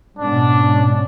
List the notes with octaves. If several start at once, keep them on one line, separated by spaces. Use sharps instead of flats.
G#2 B2 C#4 D4